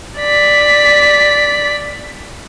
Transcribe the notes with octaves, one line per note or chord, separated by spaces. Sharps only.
D5 B6